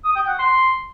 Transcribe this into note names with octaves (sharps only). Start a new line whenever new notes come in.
D#6
G5
F#5
C6